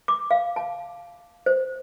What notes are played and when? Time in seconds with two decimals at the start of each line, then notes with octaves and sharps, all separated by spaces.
0.08 D6
0.31 F5
0.56 A5
1.46 C5